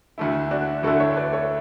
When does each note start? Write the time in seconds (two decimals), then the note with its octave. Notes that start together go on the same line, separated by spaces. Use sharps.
0.18 D2 D3 A3 E4
0.51 D4 F#4
0.83 D2 D3 A3 E4 F#4 A4
1.00 C#5 E5
1.17 B4 D5
1.33 A4 C#5